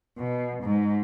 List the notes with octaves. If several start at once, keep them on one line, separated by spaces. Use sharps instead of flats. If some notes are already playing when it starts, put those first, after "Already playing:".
B2
G#2